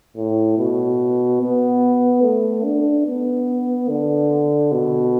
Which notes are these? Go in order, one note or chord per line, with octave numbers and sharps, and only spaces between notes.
A2
B2
B3
A3
D4
B3
D3
B2